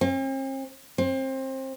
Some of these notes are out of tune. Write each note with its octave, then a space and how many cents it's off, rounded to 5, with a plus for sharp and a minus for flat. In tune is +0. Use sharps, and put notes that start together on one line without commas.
C4 +45
C4 +25